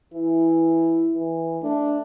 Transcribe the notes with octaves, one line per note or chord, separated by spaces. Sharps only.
E3 E4
E3
A3 D4